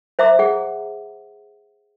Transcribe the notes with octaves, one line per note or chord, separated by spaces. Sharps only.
C5 E5 A#5 D6
G#4 F#5